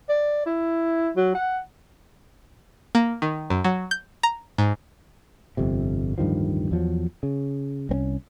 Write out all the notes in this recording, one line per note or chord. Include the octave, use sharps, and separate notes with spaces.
D5
E4
F#3
F#5
A#3
D#3
F#2
F#3
G6
A#5
G#2
G1 F2 C3
D1 G2 D#3 F3
E2 F3 F#3
C#3
C2 C4 C#4